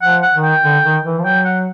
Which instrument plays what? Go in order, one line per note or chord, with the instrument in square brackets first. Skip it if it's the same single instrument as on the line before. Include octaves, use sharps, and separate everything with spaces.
[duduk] F3 [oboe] F#5
[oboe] F#5
[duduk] D#3
[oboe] G5
[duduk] D3
D#3
E3
F3
[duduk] F#3 [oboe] G5
[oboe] F#5